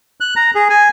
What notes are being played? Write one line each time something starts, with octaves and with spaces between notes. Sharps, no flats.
F#6
A#5
G#4
G#5